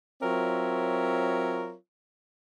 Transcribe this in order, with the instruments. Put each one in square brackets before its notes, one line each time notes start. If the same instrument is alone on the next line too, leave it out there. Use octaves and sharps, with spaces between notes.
[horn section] F#3 C4 F4 A#4 C#5 E5